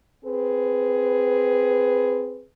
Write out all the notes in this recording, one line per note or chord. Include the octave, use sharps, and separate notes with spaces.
C4 G#4 B4